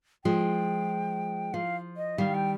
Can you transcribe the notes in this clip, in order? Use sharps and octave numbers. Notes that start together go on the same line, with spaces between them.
F3 G#3 G5
F3 F5
D#5
D#3 G3 F5
G5